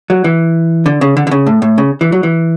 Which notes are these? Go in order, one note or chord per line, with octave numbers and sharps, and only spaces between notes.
F#3
E3
D3
C#3
D3
D3
C#3
A2
A2
C#3
E3
F#3
E3